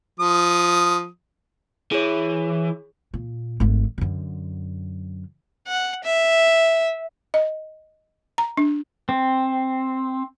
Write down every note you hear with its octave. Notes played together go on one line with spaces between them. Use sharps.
F3 D#6
E3 G#4 C#5
A#2
G#1 A3
F#2 D3
F#5
E5
D#5
A#5
D4
C4